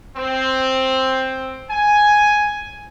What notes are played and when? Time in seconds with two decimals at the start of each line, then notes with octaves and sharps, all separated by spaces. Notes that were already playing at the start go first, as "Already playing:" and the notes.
0.17 C4
1.70 G#5